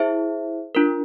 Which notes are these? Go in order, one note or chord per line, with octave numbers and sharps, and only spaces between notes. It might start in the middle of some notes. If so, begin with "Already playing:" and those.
Already playing: E4 G#4 C5 E5
D4 F4 A#4